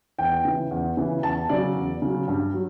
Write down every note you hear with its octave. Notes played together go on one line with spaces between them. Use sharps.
E2 G5
C#3 E3
E2
C#3 E3
E2 A5
C#3 F#3 D5
E2
C#3 F#3
G2
F#3